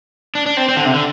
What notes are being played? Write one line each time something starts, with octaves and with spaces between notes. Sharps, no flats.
D4
D4
C4
C4
D3
C3
D3